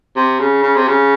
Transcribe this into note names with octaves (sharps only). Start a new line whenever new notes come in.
C3
C#3
C#3
C3
C#3